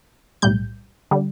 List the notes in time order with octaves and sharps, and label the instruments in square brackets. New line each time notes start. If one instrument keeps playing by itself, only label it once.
[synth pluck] B1 A2 G3 G6
D3 G3